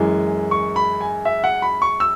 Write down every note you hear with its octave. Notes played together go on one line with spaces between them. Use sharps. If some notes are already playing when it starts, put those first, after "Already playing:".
Already playing: F#2 E3 G#3 G#5
C#6
B5
G#5
E5
F#5
B5
C#6
E6